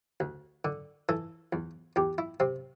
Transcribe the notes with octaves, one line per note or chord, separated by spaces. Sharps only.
D2
D3
E3 A4
E2
E2 G4
E4
C3 C4